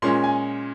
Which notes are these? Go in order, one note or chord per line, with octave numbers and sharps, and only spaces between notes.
A#2 G#3 C#4 C6
G#5